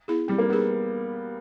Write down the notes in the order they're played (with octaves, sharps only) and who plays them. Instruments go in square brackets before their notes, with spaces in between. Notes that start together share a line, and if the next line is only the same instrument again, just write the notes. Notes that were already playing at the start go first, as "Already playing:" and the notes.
[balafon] B3 E4 G#4
[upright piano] G3 [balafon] C4
[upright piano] A#3
[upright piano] B3 [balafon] D#4
[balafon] G#4